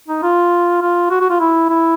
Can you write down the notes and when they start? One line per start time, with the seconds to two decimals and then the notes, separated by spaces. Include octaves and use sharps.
0.08 D#4
0.23 F4
0.81 F4
1.10 F#4
1.20 F#4
1.30 F4
1.40 E4
1.70 E4